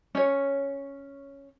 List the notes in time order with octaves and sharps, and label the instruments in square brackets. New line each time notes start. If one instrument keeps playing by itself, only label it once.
[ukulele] C#4 C#5